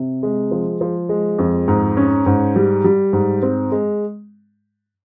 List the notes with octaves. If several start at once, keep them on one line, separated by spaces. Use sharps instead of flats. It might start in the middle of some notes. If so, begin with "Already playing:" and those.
Already playing: C3
G#3
F3
F3
G#3
F2
G#2
C#4
G#2
G3
G3
G#2
C4
G#3